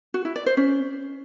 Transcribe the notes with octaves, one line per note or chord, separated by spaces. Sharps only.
F#4
E4
D5
C5
C#4